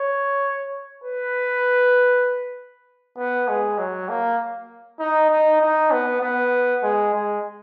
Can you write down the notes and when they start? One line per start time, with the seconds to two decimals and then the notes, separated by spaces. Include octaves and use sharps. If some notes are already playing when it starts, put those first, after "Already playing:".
Already playing: C#5
1.04 B4
3.18 B3
3.48 G#3
3.78 F#3
4.09 A#3
5.00 D#4
5.30 D#4
5.61 D#4
5.91 B3
6.21 B3
6.83 G#3
7.14 G#3